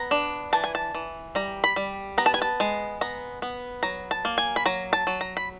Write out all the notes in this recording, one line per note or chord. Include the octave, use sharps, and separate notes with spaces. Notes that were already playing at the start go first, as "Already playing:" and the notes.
Already playing: B3 A#5
D4
E3 A5
G#5
A5
E3
G3 A#5
B5
G3
B3 A#5
A5
G#5
A5
G#3
B3 A#5
B3
F#3 A#5
A5
A#3
G#5
B5
F#3 A#5
A5
F#3
A#5
B5